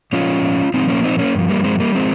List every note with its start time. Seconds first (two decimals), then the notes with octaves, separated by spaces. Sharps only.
0.13 A#2 F3 C#4 F4
0.74 A#2 F3 C4 D#4
0.88 A#3 C#4
1.04 C4 D#4
1.19 A#3 C#4
1.35 G2 F3
1.49 G3 A#3
1.64 G#3 C4
1.80 G3 A#3
1.95 F3 G#3 C4